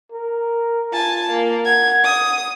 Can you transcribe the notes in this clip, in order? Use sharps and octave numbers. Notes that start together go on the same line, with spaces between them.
A#4
F4 G#5 A5
A#3
F#5 G#6
D#6